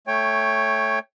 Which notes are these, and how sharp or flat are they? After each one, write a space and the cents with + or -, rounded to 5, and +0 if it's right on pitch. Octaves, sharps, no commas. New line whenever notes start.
A3 +0 C#5 +0 G5 +20